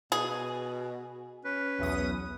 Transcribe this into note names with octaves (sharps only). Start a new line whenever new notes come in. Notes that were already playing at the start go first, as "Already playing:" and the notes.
B2 G#4
C#4 B4
B1 E2 D#6